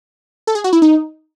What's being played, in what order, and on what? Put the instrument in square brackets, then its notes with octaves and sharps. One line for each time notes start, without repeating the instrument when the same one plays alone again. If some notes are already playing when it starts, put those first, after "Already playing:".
[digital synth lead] A4
G#4
F#4
E4
D#4